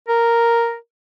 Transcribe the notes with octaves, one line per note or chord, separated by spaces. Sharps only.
A#4